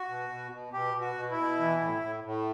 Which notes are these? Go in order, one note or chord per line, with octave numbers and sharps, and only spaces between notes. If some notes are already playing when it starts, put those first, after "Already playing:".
Already playing: F#4
B2
B2
B2
B2 G4
B2
F#4
B2
E4
B2
E3
A2
A2
A2